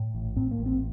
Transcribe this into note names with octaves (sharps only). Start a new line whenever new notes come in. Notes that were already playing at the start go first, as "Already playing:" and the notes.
Already playing: A2
A1
A2 C4
A#3
A1
C4